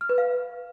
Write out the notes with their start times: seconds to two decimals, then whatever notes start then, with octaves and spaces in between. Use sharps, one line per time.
0.01 F6
0.09 B4
0.18 F5